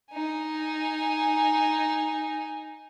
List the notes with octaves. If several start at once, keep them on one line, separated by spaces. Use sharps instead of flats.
D#4 G#5